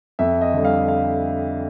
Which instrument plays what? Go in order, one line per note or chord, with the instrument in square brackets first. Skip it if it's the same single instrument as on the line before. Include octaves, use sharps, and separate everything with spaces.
[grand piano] F2 E5
D#5
D3 G3
F5
F5